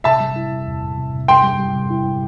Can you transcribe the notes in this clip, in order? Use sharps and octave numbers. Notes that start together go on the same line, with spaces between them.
C3 E5 A5
G3
E4
C3
E2
E2
C3
C3
G3 G5 C6
G3
G3
C3
E4
G3